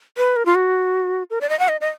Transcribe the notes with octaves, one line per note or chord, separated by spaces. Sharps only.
B4
A#4
F4
F#4
A#4
D5
D#5
F#5
D#5
D#5